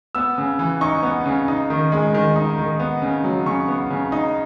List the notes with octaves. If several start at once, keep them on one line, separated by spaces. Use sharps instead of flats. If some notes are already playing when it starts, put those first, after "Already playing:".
B3 E6
C#3
E3
D#4 C#6
B3
C#3
D#4
D#3
G#3
D#3
D#4
D#3
B3
C#3
F#3
C#3 C#6
B3
C#3
D#4